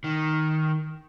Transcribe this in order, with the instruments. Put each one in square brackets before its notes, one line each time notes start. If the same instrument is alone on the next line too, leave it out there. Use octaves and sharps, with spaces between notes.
[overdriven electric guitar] D#3